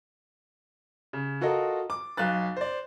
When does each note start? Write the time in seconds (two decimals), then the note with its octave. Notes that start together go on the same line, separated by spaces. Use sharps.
1.13 C#3
1.41 F4 F#4 A4 A#4 D#5
1.90 D6
2.17 B1 F5 F#6 A6
2.57 C5 D5